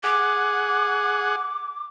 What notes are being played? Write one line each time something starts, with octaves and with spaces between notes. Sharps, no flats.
G#4 F#5 D6